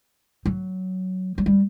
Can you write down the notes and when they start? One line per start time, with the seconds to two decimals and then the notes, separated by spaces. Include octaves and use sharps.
0.46 F#3
1.38 F#3
1.46 G3